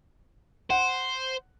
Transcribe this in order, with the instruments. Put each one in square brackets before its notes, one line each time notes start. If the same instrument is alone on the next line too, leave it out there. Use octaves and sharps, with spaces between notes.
[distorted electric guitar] C5 [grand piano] F#5